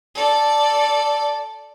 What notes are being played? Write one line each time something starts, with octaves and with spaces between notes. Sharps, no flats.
A4 D5